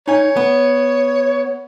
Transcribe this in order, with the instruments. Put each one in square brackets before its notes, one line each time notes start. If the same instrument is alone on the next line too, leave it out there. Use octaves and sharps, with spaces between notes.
[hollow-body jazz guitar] D#4 G#5 [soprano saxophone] C#5
[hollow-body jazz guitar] B3